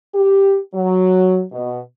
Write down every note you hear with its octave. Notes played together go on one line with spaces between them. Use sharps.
G4
F#3
B2